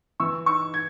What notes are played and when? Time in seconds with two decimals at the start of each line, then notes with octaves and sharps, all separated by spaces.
0.20 E3 C#6 E6
0.46 D#4 C#6 E6
0.74 D#4 G#6